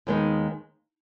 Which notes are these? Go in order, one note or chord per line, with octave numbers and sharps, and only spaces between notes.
D#2 D#3 G#3 B3 D#4